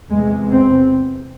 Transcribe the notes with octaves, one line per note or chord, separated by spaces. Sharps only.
E2 C3 G#3
C4